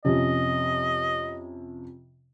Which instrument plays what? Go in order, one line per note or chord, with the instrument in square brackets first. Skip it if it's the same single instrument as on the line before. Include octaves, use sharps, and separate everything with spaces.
[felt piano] F2 C3 C#4 [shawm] D#5